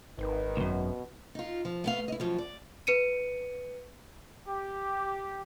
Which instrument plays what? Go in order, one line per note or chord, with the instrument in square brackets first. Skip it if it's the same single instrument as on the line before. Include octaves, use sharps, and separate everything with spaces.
[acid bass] G#1 [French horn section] D#3 B4
[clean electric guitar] C#2 F#2 [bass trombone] B2
[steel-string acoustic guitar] D#4 F4
F3
A3 B3 F5
E4 D#5
F#2 F3
D5
[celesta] B4 C#7 D#7
[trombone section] G4